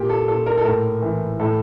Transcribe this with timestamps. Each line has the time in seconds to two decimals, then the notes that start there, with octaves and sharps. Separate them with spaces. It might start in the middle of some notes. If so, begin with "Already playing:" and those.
Already playing: A#2 G4
0.09 A4
0.28 A#2 A4
0.46 A#4
0.57 A4
0.64 A2 A#4
1.02 E3
1.40 A2 A4